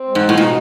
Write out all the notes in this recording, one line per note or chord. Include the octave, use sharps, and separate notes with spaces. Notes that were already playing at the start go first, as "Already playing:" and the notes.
Already playing: C4
G#3
G#2
B2
A2
A#2 D#4